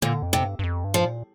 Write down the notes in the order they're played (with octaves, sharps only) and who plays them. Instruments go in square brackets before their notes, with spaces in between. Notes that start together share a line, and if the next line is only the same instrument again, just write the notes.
[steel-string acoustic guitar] A#2 [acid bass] D3
[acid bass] F2
[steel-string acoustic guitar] C3
[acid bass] G2
G2
F2
G2
[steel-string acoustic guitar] F3
[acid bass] A#2